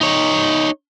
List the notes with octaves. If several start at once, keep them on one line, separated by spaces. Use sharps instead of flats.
D#4 C#5